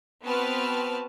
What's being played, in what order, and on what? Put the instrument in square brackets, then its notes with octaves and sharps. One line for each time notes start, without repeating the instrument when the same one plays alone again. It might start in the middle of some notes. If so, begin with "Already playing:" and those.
[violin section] B3 C4 F#4 B4 A5 F6